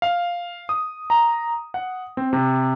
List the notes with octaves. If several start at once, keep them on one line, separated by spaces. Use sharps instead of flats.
F5
D#6
A#5
F#5
C4
C3